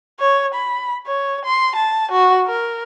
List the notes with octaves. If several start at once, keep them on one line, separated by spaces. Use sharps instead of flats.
C#5
B5
C#5
C6
A5
F#4
A#4